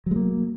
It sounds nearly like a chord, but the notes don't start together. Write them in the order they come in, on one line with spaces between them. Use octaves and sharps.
F#3 G#3 A#3